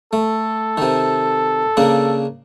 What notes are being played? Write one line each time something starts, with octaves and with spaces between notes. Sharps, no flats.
A3 A4
C3 D#3
C#3 A#3 D4